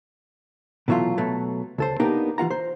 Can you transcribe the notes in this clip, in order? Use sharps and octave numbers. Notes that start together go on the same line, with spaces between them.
B2 E3 F#3 A3 F4
B2 F#3 A3
C#2 A4 C5
A#3 B3 D4 D#4 G4 A#4
E3 F4 F#5 A#5
C5